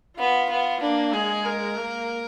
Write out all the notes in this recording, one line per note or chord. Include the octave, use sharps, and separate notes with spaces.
B3 F4
B3
A#3 D4
G#3 G#4
A#4
A#3